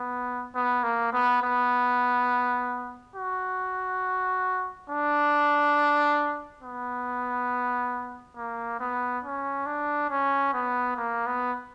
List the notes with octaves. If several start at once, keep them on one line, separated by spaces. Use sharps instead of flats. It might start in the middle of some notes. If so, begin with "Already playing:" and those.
Already playing: B3
B3
A#3
B3
B3
F#4
D4
B3
A#3
B3
C#4
D4
C#4
B3
A#3
B3